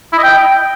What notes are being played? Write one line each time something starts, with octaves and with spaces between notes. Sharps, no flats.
E4
D#5
G5